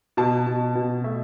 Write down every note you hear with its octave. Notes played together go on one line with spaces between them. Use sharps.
B2 A5
B2
B2
A3 E5